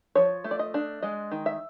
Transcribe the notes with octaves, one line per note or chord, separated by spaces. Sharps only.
F3 C#5
A3
D5
D#5
D4
G#3 D#5
D#3
E5